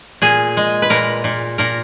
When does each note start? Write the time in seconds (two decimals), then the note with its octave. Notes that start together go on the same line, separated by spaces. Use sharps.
0.22 A#2 G#4
0.57 G#3
0.82 B4
0.90 A#2 A#4
1.24 A#2
1.58 A#2 A#4